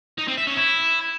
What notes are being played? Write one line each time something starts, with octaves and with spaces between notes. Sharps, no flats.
D#4
C4
E5
C#4
E4